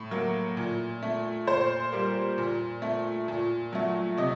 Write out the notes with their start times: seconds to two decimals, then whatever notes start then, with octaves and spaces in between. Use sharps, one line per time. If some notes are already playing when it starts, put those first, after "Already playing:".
Already playing: A2
0.11 F#3 A#3
0.57 A#2
1.03 A3
1.47 A#2 C5
1.92 G3 A#3
2.38 A#2
2.82 A3
3.28 A#2
3.73 F#3 A3
4.17 C3 D#5